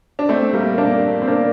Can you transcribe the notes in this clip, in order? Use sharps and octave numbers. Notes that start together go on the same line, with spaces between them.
D4
A3 C4
G3 A#3
A#3 D4
C4
A#3 D4